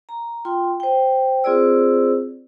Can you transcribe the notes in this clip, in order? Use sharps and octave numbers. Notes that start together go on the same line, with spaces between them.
A#5
F4 G5 C6
C5 G5
C4 F4 G#4 C5 D5 E6